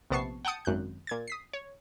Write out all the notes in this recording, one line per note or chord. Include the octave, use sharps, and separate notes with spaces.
A#1 C3 B3 A5 C#6 C7
F#5 G5 A5 D#6 C#7
G#1 F#2 F#6 G6
A#2 G#6 A6
D#6 B6 C7
C#5